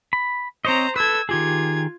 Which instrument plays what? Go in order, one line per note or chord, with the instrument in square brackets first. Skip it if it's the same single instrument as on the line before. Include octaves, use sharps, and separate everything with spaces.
[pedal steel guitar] B5
[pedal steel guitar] C4 C#5 D#5 [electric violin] C5 A#5
[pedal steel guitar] A4 B4 [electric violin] E6 G#6
[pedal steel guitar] D#3 G4 G#4 [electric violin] F4 G#6